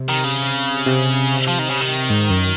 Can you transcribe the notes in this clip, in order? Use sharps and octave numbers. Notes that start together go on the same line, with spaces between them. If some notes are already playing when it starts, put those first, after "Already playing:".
Already playing: C3
D#3
C#3
C3
F3
D#3
C#3
D#3
G#2
F#2